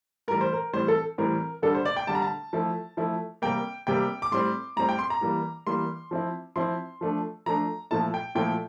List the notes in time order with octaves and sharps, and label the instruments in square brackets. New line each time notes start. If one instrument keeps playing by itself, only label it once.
[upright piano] A2 E3 G3 A#4
C5
A#4
A2 E3 G3 C4 C5
A4
A2 E3 G3 C4 A#4
D3 G3 D4 A4
C5
D5
G5
D3 G3 D4 A5
A#5
A5
F3 A3 E4
F3 A3 E4
C3 G3 A#3 G5
C3 G3 A#3 G5
D6
A2 G3 C4 C6
A2 G3 C4 A#5
G5
C6
A#5
E3 G3 A#3
E3 G3 A#3 C6
F3 C4 E4
F3 C4 E4 C6
F3 A3 D4
F3 A3 D4 A#5
A#2 F3 A3 E4 A5
G5
A#2 F3 A3 E4 G5